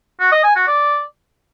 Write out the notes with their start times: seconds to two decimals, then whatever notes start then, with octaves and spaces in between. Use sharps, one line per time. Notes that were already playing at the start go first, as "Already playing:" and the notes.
0.20 F#4
0.32 D#5
0.44 G#5
0.55 F#4
0.67 D5